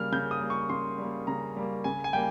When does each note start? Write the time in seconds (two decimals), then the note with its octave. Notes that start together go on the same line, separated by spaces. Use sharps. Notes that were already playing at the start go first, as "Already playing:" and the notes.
Already playing: C#3 G3 A#3 F6
0.12 C#3 G6
0.31 D#6
0.41 G3 A#3
0.50 C#6
0.69 C#3 C6
0.98 G3 A#3
1.27 C#3 A#5
1.56 G3 A#3
1.84 C#3 G#5
2.04 G#5
2.13 G3 A#3 G5